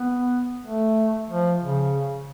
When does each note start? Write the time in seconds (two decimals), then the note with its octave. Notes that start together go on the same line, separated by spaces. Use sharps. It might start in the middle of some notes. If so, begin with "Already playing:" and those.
Already playing: B3
0.66 A3
1.30 F3
1.62 C#3